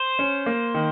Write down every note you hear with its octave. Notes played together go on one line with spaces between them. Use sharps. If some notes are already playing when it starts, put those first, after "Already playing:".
Already playing: C5
C#4
A#3
D#3